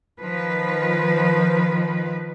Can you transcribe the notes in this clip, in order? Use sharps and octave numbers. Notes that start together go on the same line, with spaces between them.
D#3 F3 B4